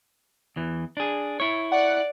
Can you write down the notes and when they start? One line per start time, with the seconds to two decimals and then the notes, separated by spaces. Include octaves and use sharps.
0.56 E2 E3
0.97 D4 G#4
1.40 E4 C#5
1.72 D5 F#5